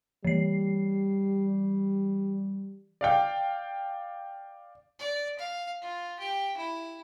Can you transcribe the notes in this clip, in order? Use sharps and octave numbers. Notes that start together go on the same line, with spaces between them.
E3 G3 C7
D5 F5 G5
D5
F5
F4
G4
E4